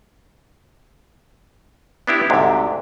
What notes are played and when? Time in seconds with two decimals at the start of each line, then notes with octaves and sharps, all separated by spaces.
2.07 B3 D4 E4 G4
2.30 D2 G#2 C3